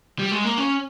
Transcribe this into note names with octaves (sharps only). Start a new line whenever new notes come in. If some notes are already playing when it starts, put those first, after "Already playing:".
G3
G#3
A#3
C#4